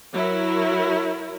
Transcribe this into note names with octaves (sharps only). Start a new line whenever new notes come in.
F#3 E4 A#4